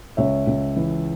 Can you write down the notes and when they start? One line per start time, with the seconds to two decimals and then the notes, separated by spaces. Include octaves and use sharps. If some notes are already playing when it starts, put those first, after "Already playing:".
0.17 C#2 C#5 E5
0.47 C#2
0.76 E3